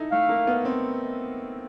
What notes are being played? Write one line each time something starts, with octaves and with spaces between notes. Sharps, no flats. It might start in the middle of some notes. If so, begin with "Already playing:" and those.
Already playing: D#4 E4 A4
A3 F5
A#3
B3
C4